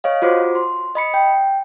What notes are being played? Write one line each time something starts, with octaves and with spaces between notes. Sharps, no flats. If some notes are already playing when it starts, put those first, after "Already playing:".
C#5 D#5 F5
F4 F#4 C5 D6
C6
D#5 B5 C#7
G5